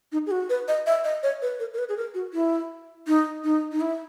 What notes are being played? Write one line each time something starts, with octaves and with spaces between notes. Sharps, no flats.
D#4
G#4
F#4
B4
D#5
E5
D#5
C#5
B4
A#4
A#4
B4
G#4
A#4
F#4
E4
D#4
D#4
D#4
E4